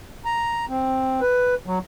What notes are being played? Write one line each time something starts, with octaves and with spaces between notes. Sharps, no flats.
A#5
C4
B4
F#3